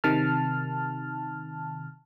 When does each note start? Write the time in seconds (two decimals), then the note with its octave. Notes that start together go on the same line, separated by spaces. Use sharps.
0.04 C3 D#3 A5 F6